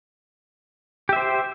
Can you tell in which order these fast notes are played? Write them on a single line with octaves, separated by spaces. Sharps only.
G4 E5 C5